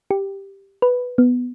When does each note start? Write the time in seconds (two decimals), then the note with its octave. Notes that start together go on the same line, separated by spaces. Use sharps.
0.11 G4
0.82 B4
1.18 B3